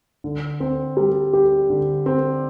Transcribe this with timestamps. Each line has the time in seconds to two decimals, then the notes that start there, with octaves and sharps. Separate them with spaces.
0.24 D3
0.60 C4
0.97 G3
1.33 G4
1.70 D3
2.06 C4